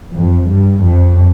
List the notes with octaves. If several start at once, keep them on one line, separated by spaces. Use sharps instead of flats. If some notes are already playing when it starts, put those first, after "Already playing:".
F2
G2
F2